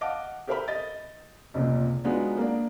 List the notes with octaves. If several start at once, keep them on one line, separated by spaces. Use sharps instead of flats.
D#5 F5 F#5 A5 D6
G4 A4 A#4 C5 E5 B5
D#5 A6
F1 C#2 A#2
F#3 G#3 B3 D4 D#4 F4
A#3 D4